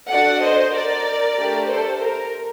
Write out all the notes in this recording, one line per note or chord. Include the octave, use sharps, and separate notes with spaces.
D4 F#4 A4 D5 F#5
C5 D#5
A#4 D5
A3 D4 G4
A4 C5
A#4